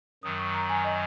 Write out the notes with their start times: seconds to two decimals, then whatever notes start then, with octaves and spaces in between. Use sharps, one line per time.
0.23 F#2 D#3 F#3 D#6
0.39 C#6
0.54 A#5
0.69 G#5
0.85 D#5